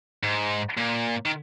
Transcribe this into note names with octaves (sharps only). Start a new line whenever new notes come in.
G#2
A#2
D#3